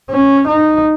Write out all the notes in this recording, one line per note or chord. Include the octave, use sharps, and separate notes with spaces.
C#4
D#4